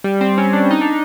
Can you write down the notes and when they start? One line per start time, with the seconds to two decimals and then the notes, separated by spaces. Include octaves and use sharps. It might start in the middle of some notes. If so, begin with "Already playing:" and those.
0.04 G3
0.21 C4
0.38 C#4
0.53 D4
0.71 D#4
0.81 D4